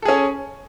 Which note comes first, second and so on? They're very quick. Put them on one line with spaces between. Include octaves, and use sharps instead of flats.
A4 G#4 C#4